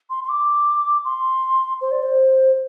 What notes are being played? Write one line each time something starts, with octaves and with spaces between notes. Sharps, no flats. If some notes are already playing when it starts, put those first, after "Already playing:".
C6
C6
D6
C6
C5
D5
C5